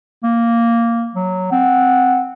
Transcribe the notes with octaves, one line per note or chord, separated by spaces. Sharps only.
A#3
F#3
C4 F#5